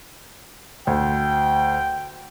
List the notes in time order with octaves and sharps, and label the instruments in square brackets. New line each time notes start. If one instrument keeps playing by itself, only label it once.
[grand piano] D2 [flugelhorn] G5